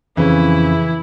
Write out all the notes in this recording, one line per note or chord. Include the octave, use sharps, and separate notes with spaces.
F2 C#3 E3 E4